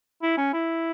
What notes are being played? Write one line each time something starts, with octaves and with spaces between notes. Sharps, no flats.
E4
C#4
E4